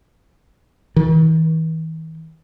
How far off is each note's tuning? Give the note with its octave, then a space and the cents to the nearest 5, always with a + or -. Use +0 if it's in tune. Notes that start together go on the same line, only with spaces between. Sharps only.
E3 -45